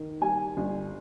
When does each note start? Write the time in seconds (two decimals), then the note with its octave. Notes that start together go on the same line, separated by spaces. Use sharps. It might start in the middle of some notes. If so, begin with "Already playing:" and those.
Already playing: D#3
0.21 G3 G#5
0.57 G1